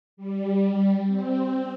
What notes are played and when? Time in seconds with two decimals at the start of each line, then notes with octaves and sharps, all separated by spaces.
0.17 G3
1.07 C4